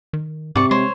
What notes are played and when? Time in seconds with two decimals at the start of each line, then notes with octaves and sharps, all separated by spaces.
0.13 D#3
0.56 G#2 C3 D5 C#6
0.71 G#3 C5 C#5